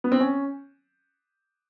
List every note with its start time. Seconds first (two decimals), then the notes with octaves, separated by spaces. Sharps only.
0.04 B3
0.12 C4
0.20 C#4